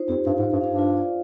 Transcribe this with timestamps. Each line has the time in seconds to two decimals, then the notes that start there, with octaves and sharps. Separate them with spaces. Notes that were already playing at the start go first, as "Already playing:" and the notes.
Already playing: D#4 F4 C5
0.09 F2 G4
0.26 G2 F5
0.39 G#2
0.44 C5
0.53 G2
0.61 F5
0.66 G2
0.79 F4
0.97 D5